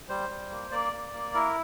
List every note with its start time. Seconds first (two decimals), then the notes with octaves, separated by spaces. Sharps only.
0.09 G3 C5
0.29 G3
0.50 A#3
0.71 A#3 D5
0.93 A#3
1.13 A#3
1.34 E4 A#4